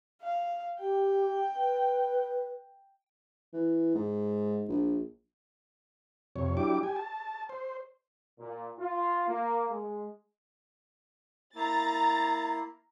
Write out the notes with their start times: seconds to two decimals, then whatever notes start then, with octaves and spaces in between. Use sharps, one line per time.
0.22 F5
0.80 G4 G5
1.56 B4
3.53 E3
3.95 G#2
4.68 A#1
6.36 F2 C3 C#5
6.57 F#3 D4 E4 G4 D6
6.83 G4 G#5
6.96 A5
7.49 C5
8.40 A#2
8.79 F4
9.28 A#3
9.70 G#3
11.56 A#3 E4 A#5 A6